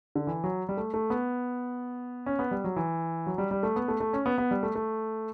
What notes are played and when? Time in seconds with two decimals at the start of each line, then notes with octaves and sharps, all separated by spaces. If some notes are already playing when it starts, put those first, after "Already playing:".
0.15 D3
0.27 E3
0.44 F#3
0.69 G3
0.77 A3
0.94 A3
1.10 B3
2.26 C#4
2.39 B3
2.51 G3
2.64 F#3
2.76 E3
3.27 F#3
3.38 G3
3.51 G3
3.63 A3
3.76 B3
3.88 A3
4.00 A3
4.13 C#4
4.26 B3
4.38 B3
4.51 G3
4.63 A3
4.75 A3